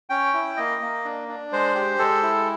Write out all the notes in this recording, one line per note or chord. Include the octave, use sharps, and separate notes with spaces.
C#4 G5
E4
A#3 D#5
A#3
D4
D4
G#3 C5
G4
G#3 A4
E4